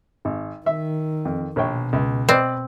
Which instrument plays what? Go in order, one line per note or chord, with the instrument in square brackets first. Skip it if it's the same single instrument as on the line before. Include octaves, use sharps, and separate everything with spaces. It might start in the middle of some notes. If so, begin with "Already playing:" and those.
[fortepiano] G#1
[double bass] D#3 [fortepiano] E5
[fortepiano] F2
[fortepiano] A#1 C#5 G5 [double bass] B2
[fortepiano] C#2
[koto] C4 [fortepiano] B4 D5 D#5